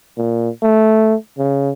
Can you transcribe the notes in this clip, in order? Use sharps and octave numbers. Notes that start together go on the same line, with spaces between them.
A#2
A3
C#3